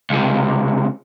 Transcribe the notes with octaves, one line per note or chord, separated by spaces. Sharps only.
C#2 C3